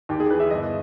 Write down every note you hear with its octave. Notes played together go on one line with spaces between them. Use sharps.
D#2 G4
G#4
E3 B4
E5
G1 D#5